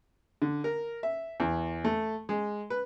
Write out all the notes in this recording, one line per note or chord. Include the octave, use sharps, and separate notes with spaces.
D3
A#4
E5
E2
A3
G#3
B4